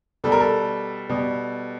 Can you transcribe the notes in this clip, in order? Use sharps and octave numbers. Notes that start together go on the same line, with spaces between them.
B2 G3 A4
A#4
A4
B2 G3